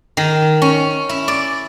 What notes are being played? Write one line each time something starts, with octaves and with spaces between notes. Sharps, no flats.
D#3
C#4
E4
D5